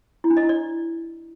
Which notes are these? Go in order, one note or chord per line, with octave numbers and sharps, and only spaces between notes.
E4
D4
D#5
E4
D5